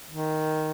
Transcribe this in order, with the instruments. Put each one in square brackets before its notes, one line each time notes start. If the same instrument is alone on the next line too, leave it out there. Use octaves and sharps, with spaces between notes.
[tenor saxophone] D#3